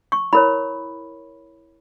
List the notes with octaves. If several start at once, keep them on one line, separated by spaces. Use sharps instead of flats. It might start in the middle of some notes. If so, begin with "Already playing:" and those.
C#6
E4 A#4 C#5 B5